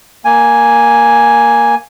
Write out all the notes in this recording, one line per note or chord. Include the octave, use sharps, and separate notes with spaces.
A#3 G#5